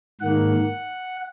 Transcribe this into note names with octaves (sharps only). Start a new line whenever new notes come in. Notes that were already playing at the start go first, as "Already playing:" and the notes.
G#2 D#3 A#3 F#5